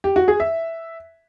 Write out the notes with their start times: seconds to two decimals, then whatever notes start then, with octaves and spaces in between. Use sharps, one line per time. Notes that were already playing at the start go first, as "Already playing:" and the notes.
0.04 G4
0.16 F#4
0.28 G#4
0.40 E5